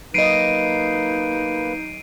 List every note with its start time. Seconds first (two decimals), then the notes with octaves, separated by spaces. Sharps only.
0.14 F#3 A#3 D#4 B4 D#5 C7 D7 D#7